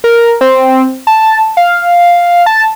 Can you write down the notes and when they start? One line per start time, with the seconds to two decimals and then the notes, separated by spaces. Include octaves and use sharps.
0.04 A#4
0.41 C4
1.07 A5
1.57 F5
2.46 A5